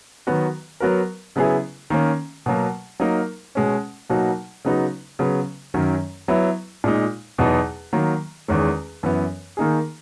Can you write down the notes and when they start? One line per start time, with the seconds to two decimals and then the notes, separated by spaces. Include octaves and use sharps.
0.27 D#3 F#3 B3 F#4
0.80 F#3 B3 F#4 A#4
1.36 C#3 F#3 B3 E4 G#4
1.90 D#3 A#3 C#4
2.46 B2 F#3 A#3
3.00 F#3 A#3 D#4 A#4
3.55 B2 G#3 C#4
4.10 B2 F#3 A#3 D#4 F#4
4.65 C#3 F#3 B3 D#4 F#4
5.19 C#3 F#3 B3
5.74 F#2 D#3 F#3 C#4
6.28 F#3 B3 E4
6.84 A#2 G#3 D#4
7.38 E2 B2 F#3 B3 D#4
7.93 D#3 F#3 A#3
8.48 E2 D#3 G#3 C#4
9.03 F#2 E3 B3
9.57 D#3 A#3 D#4 G#4